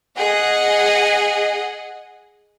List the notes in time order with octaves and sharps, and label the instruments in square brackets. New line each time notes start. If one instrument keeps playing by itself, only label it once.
[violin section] G#4 D#5 F#5